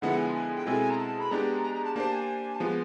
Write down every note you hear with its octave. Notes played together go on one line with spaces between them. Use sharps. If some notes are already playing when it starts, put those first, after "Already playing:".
D3 F3 G#3 B3 E4 F#5
G#5
G#5
G5
B2 G#3 C4 E4 A4 G#5
A#5
A5
B5
G#3 B3 D4 G4 A#5
A#5
A#5
A5
A#3 D4 G4 C5 A5
G#5
A5
F3 G#3 B3 G#5